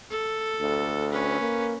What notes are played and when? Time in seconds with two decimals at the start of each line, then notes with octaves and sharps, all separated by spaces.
0.10 A4
0.60 D2
1.11 C#4 B4
1.40 A#3